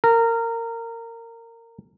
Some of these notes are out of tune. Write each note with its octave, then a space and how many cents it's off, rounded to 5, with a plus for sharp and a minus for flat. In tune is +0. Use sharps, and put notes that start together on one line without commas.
A#4 -20